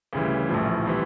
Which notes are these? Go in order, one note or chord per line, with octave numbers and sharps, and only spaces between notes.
D2 C#3 E3 G3
A#1 A2 F3
E3 G3 C4